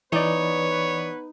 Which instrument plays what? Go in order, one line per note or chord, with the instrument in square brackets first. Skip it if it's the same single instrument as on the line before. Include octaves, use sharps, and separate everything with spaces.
[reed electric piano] E3 D5 [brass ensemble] B3 B4 [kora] D#4 [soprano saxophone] C#5